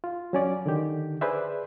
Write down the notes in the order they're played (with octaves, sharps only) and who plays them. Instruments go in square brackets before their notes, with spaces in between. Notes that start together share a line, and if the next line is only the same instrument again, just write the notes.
[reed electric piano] F4
F#3 C#4 D5
D3 D#3 G4
G#4 B4 C5 D5 E5